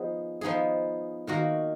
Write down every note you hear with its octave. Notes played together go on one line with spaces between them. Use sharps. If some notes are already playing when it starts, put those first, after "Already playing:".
Already playing: F3 B3 D#4 G#4
F3 B3 D#4 G#4
D#3 A#3 D#4 F#4 A#4